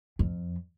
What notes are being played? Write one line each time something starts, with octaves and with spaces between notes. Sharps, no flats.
F2